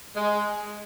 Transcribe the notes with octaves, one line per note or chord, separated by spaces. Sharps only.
G#3